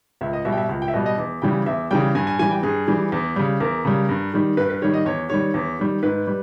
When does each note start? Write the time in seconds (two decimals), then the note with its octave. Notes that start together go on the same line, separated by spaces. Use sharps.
0.21 C#2 E5
0.33 D#5
0.45 B2 G3 E5
0.52 G5
0.57 E5
0.69 C#2
0.82 G5
0.88 E5
0.94 B2 G3 D#5
1.06 D#5
1.18 E2
1.42 C#3 E3 G3 G5
1.66 E2 E5
1.91 C#3 E3 G3 G5
2.15 G2 G#5
2.27 G#5
2.39 E3 G3 G#5
2.51 G5
2.63 G2 G#4
2.88 E3 G3
3.12 E2
3.36 C#3 G3
3.60 E2 A#4
3.85 C#3 G3
4.09 G2
4.34 D#3 G3
4.57 G2 B4
4.70 B4
4.82 D#3 G3 C#5
4.93 D#5
5.05 E2 C#5
5.30 D#3 G3 C#5
5.54 E2
5.79 D#3 G3
6.03 G#2 B4
6.27 G3